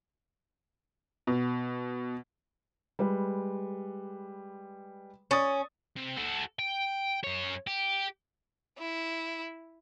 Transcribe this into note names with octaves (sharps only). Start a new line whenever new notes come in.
B2
G3 G#3 B4
C#4 D#6 A6 C#7
C3
F#4 A4
G5
F#2 C#5
G4
E4